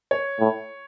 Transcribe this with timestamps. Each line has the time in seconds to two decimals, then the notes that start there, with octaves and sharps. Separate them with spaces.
0.11 C#5
0.40 A2